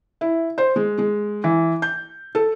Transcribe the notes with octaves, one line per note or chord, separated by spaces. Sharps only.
E4
C5
G#3
G#3
E3
G6
A4